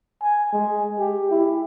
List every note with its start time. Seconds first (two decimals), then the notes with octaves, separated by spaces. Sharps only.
0.22 G#5
0.53 G#3
0.99 G4
1.31 E4